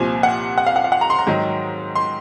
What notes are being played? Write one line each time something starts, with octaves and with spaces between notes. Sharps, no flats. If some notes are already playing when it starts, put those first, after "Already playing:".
Already playing: C2 A#2 F3 G#5
F#5
F#5
F5
F#5
F5
F#5
A#5
C6
A#5
G#2 D#3 F#3
C6